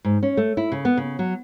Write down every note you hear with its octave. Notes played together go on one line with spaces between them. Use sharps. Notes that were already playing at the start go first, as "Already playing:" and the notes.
G#2
C#4
A3
E4
C#3
B3
C#3
F#3